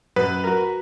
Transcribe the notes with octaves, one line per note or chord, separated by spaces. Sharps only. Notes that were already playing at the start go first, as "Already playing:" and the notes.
F#2 B4
F#4 A#4